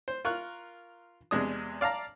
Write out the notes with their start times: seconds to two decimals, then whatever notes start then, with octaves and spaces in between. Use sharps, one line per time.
0.08 C5
0.25 F4 A#4 C#6 F#6
1.31 E2 C3 G#3 D4 D#6
1.81 D5 F5 A5 A#5